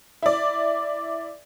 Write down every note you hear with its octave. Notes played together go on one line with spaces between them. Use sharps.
E4 D5